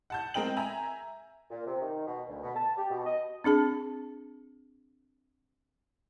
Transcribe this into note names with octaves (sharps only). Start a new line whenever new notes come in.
F#5 A5 G6
G#3 C4 A#4 D#5 G5 F#7
E5 G#5 A#5
A#2
C3
D#3
B2
D2
B2
A5
G4
B2
D#5
C4 D4 G#4 A5